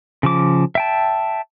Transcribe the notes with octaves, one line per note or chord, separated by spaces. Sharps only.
C#3 F3 D6
E5 G5 A5